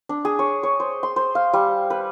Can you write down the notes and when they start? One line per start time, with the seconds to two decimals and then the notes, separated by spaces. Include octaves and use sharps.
0.09 D4
0.25 G#4
0.39 C#5
0.63 C#5
0.80 C5
1.03 C6
1.16 C5
1.35 F5
1.53 G3
1.90 B4